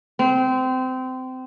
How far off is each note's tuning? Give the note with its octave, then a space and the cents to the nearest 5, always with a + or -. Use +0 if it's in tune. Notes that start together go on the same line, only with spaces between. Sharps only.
C4 -25